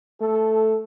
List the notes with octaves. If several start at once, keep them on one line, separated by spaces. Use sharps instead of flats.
A3 A4